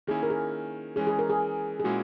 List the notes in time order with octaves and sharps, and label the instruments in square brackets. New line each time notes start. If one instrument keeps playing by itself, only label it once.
[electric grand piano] D#3 A#3 C#4 E4 [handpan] G#4
[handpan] A#4
G#4
[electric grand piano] E3 G#3 C#4 [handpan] G#4
[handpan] G#4
A#4
G#4
G#4
[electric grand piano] A#2 G#3 C#4 E4 [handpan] F#4